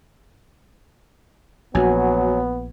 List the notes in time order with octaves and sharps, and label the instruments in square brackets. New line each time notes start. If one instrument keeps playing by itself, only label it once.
[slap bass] A#1 [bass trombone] F#3 [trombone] B3 [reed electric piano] F#4 G#5